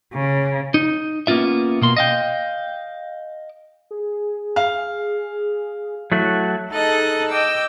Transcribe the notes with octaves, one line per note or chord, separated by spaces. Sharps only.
C#3
D#4
A#3 B3 C#4 F4 E5
B2 A#3 C6
D#5 F5 G5
G#4
F5
F#3 A3 E4 F#4
D#4 G#4 A4 D#5 F#6 A6
D#5 G5 D6 E6